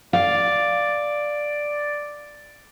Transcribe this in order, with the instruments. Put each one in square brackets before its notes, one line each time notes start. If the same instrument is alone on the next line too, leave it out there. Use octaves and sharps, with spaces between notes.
[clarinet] D5 [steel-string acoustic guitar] F5